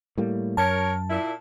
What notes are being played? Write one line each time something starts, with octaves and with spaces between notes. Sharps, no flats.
A2 G3 A#3
F#2 A#4 C#5 A5
A#2 E4